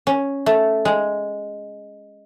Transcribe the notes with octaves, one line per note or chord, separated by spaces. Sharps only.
C#4
A3
G#3